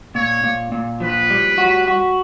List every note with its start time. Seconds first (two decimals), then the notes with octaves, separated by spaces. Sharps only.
0.15 A#2 C#5
0.44 A#2
0.72 A#2
1.00 F3 B4
1.30 G3
1.58 F#4
1.88 F#4